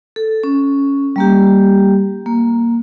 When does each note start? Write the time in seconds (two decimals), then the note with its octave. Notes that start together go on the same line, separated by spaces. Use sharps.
0.16 A4
0.43 C#4
1.16 G3 A#3 G4
2.26 A#3